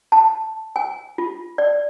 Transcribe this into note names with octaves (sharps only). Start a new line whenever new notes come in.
A5
G#5
F4
D5